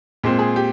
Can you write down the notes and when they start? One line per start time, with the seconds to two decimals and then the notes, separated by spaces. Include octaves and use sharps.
0.24 A#2 G#3 C4
0.39 G#4
0.56 G4